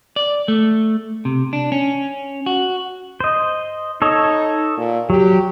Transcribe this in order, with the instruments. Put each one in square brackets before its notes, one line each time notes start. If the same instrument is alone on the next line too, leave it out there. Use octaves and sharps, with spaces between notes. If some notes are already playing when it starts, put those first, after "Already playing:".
[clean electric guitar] D5
A3
C3
D4
C#4
F#4
[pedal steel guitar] C5 D#5
[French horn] D#4 [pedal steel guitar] A4 C#5 D#5
[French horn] A#2
[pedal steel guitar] F#3 [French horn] G4